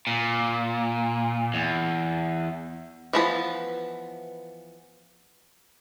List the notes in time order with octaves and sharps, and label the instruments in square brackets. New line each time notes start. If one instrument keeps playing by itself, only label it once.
[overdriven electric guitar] A#2
E2
[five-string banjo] E3 F3 B3